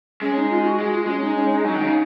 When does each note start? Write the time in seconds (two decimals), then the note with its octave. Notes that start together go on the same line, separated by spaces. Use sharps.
0.22 G#3 C#4
0.36 D#4
0.50 F4
0.65 F#4
0.79 G#3
0.93 F4
1.07 G#3 C#4
1.22 D#4
1.36 C#4
1.50 D#4
1.64 F#3 D#4
1.74 D#3
1.83 C#3